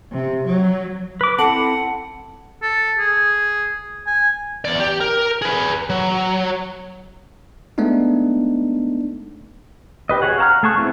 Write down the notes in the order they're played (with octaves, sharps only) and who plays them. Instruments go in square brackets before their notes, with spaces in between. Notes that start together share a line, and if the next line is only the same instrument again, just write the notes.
[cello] C3
F#3
[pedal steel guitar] B4 D6
[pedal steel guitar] C4 E4 [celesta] A4 A5 F#7 [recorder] F#5
[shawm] A4
G#4
G#5
[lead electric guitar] E2 D5
G4
A#4
G#4 B4
F#3
[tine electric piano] G#3 A3 B3 D4 D#4
[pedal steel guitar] G4 B4 D#5
F#4 G#4 C#5 F#5
F5 F#5 A5 A#5 F6
A3 G#4 A5 C#6 F#6
A3 B3 C4 E4 G#4